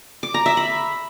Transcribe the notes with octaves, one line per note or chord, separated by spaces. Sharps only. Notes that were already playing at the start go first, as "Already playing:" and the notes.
D6
A#5
E5
B5